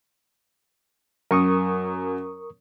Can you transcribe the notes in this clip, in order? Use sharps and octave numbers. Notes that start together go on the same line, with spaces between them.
F#2 A#4 C#6 D#6